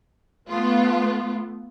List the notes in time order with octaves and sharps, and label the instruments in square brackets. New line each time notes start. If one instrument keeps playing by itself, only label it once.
[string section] A3 B3 F4